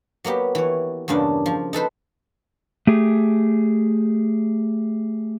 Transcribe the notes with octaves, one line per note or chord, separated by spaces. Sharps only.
F#3 A#3 B3 G4
E3 C#5
E2 G2 C#3 A#3 D4
F3
D#4 A4 B4 C5
A3 G4 G#4